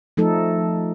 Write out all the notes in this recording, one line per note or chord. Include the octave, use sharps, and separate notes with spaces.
F3 A3 D#4 A4